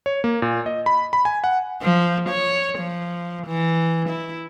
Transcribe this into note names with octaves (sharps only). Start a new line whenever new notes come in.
C#5
A#3
A#2
D#5
B5
B5
G#5
F#5
F3
C#5
F3
E3
E4